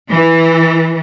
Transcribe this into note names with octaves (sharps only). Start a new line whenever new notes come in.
E3